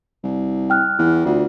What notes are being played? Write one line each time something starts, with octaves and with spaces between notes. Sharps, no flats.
C2
G5 F6 F#6
E2
D2 F4